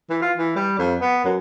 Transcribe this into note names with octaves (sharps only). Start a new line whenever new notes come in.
E3
F4
E3
G3
F2
B3
F#2